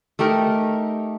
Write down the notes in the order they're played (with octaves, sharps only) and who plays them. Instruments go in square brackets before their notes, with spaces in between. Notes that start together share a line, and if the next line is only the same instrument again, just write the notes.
[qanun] A3 D#4 G4 A#4